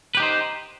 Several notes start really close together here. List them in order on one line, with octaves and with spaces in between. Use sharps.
B4 G4 D#4 C5